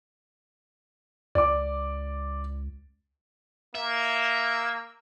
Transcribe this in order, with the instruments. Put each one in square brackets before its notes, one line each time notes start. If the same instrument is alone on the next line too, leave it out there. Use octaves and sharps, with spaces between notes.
[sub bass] C#2 [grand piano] D5 D6
[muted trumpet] A#3 [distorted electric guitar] E5